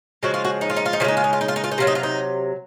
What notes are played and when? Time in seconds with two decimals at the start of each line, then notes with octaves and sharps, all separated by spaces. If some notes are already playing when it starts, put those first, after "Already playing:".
0.23 C#3 F3 G#3 F#4
0.34 F4
0.44 F#4
0.61 D#4
0.70 F4
0.77 D#4
0.86 F4
0.93 D#4
1.00 C#3 F3 F4
1.04 G#3 D#4
1.17 F4
1.24 D#4
1.33 F4
1.41 D#4
1.48 F4
1.56 D#4
1.64 F4
1.71 D#4
1.78 C3 F#3 F4
1.87 D#4
1.95 F4
2.03 D#4